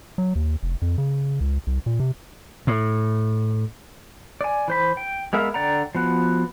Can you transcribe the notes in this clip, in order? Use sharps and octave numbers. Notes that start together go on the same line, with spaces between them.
F#3
D#2
F1
F2
C#3
C#2
C2
A#2
C3
A2
D5 G#5
E3 C5 B5
G5
G#3 B3 A#4 E5 F5
D3 D5 F#5 G5 A#5
F3 B3 F#4